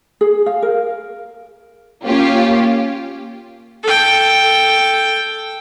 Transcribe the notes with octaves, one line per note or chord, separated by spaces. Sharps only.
G#4
F5
A#4
A#3 C#4 F4 G4
A4 G5